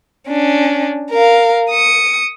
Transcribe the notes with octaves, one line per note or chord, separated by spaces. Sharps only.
C#4 D4
A#4 F5
D#6 C#7